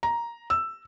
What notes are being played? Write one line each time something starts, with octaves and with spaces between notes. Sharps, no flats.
A#5
E6